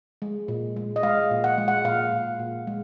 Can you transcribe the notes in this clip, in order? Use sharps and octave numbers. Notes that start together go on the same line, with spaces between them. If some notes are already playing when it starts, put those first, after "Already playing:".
G#3
A#2
G#3
D#5
G#3 F5
A#2
F#5
G#3
F#5
A#2 F5
A#2
A#2
G#3